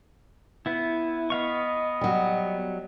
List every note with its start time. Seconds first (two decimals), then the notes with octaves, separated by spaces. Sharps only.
0.66 B3 E4
1.30 B3 D#5 F5 C#6
2.01 F#3 G3